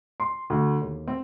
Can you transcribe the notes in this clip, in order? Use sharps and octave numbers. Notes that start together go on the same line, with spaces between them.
C6
D2
D#2
C4